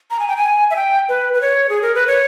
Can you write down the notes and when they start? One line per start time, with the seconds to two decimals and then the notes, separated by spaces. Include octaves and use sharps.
0.11 A#5
0.19 G#5
0.28 G5
0.37 G#5
0.71 E5
0.76 G5
1.09 B4
1.34 B4
1.41 C#5
1.69 G#4
1.82 A#4
1.95 B4
2.07 C#5